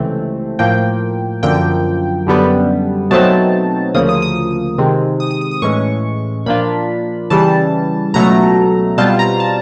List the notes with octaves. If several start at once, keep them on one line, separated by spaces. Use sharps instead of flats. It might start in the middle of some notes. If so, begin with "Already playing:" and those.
Already playing: C#2 C3 E3 A3 C4
A2 F3 A#3 G5
F#2 D3 F3 A#3 G5
F#2 D3 G3 B3
B2 F#3 A3 C4 D#4 A5
D2 C#3 F3 A#3 D#6
D#6
D#6
C3 D#3 G#3 C4
D#6
D#6
D#6
D#6
A2 E3 G#3 C#4 C#6
A#2 F3 A#3 D4 F4 B5
C#3 E3 G3 A5
C#2 B2 F#3 A3 A#5
B2 G3 C4 F4 A5
A#5
A5